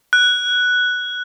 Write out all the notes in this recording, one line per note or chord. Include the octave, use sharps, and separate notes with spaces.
F#6